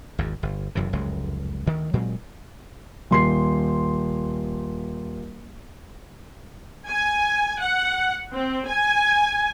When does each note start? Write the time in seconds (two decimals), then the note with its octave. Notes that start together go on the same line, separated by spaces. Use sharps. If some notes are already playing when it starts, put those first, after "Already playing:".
0.18 G#1 E2 G#2
0.43 G1
0.75 F#1 F#2 C3 E3
0.93 F1 C#2 F#2 G#3
1.66 D2 D#3
1.94 A#2 F#3 G#3 C4
3.11 D#1 C6 C7
6.87 G#5
7.59 F#5
8.32 C4
8.66 G#5